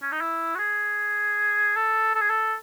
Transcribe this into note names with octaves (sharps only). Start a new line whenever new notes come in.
C#4
D#4
E4
F#4
G#4
A4
A4
G#4
A4